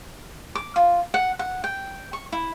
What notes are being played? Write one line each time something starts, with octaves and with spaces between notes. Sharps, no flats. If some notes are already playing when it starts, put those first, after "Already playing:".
D6
F4
F#5
F#5
G5
C#6
E4